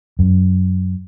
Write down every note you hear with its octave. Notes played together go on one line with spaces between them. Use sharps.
F#2